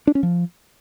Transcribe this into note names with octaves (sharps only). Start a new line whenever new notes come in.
D4
C#4
F3